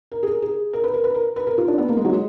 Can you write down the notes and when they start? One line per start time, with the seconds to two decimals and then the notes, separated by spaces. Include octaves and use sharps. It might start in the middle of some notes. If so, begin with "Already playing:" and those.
0.12 A#4
0.23 G#4
0.27 A#4
0.42 G#4
0.73 A#4
0.84 B4
0.94 A#4
1.04 B4
1.14 A#4
1.36 B4
1.47 A#4
1.58 F4
1.68 D4
1.78 B3
1.89 A#3
1.97 G#3
2.05 F#3
2.12 G#3